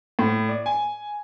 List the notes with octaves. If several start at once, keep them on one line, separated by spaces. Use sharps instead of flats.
A2
D5
G#5